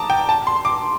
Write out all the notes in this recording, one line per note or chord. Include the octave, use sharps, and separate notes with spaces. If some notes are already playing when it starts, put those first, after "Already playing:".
Already playing: A5 A#5 D6 D#6
G5
A5
C6
D6